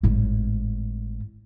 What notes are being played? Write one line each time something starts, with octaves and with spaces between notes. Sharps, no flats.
G#1 A2